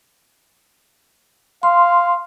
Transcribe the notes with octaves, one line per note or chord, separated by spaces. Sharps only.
F5 C6